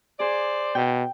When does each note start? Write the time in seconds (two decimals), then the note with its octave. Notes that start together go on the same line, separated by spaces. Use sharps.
0.20 G#4 C5 D5
0.75 B2 G5